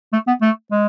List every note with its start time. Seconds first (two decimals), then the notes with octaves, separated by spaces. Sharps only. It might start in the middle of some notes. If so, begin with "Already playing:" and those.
0.13 A3
0.28 B3
0.42 A3
0.72 G#3